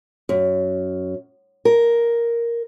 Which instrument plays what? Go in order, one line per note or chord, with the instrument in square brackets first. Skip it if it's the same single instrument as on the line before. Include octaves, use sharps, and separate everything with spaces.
[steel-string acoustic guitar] F#2
A#4